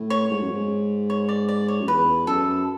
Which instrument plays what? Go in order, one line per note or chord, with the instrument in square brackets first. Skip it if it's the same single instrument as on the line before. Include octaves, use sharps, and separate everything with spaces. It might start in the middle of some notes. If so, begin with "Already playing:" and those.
Already playing: [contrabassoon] A2
[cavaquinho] C#5
[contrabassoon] G#2
F#2
G#2
[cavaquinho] C#5
D5
D5
C#5
[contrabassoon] F#2
[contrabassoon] E2 [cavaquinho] B4
[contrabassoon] F#2 [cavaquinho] A4